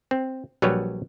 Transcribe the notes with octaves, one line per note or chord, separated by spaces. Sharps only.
C4
A#1 F#3 G3 B4 C#5